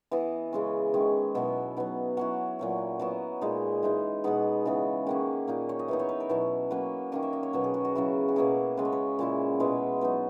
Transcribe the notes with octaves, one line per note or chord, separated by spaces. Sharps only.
E3 B3 E4 D#5
C#3 G#3 C#4
D#3 G#3 C#4
B2 F#3 B3 E4 E5
F#3 B3 D#4
F#3 C#4 E4 F#5
A#2 F#3 C#4
F#3 B3 E4 D#5
A#2 G#3 D#4
E3 G#3 D#4
B2 G#3 B3 D#4 F#5
C#3 E3 B3
D#3 A#3 C#4 F#5
A#2 A#3 D#4
C#5
D#5
E3 B3 D#4 E5
C#5
B4
A#4
B2 F#3 C#4 E4
F#3 A#3 C#4 B4
D#3 A#3 C#4 D#5
E5
D#5
C#5
B2 F#3 B3 A#4
G#4
F#4
F#4
C#3 F#3 C#4 E4
F#4
B2 A#3 E4 G#4
C#3 G#3 C#4 B4
C#5
B4
A#2 G#3 C#4 E4
B2 G#3 B3 E4 B4
F#3 B3 D#4